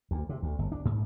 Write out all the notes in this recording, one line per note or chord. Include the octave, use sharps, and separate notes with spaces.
D2
C3
D2
G1
D4
G#2